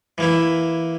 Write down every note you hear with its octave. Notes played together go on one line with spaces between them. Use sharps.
E3 A#3 E4